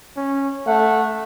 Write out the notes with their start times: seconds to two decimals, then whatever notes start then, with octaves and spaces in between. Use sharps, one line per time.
0.16 C#4
0.67 A3 F#5